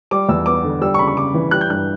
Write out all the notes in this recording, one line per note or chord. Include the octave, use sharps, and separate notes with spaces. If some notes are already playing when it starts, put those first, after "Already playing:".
G3 D6
E2 E6
B3 D6
D3
G3 E6
C#6
C#3 B5
C#6
C#3 D6
E3
G3 F#6
G6
G2 F#6